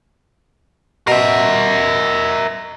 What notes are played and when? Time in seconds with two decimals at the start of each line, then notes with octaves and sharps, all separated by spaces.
1.07 B2 A#4 E5